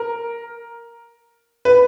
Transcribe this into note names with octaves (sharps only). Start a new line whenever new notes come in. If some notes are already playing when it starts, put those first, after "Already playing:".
Already playing: A#4
B4